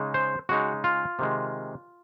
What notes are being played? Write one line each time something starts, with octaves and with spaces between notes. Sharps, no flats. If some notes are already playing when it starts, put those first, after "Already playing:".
Already playing: C#3 G#3 D#4
C5
C#3 G#3 D#4 F#4
F4
C3 D#3 G#3